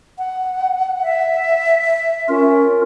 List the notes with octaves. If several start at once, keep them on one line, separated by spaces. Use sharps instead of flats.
F#5
E5
C#4 F4 A#4